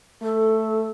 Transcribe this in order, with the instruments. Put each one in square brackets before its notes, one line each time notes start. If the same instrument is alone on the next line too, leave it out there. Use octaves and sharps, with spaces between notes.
[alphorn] A3 [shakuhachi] A4